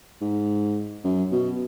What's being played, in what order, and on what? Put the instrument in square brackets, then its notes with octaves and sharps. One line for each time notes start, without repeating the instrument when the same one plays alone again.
[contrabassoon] G#2
F#2
B2